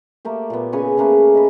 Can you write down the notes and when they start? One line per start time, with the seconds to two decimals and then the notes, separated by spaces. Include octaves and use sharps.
0.25 A3 A#3 G4
0.50 A#2 B3
0.72 C#3 B4 G#5 C#6
0.97 C#3 A3 A#3 B4
1.35 D#5 B5